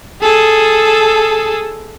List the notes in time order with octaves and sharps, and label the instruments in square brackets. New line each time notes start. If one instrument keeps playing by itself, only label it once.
[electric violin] G#4 A4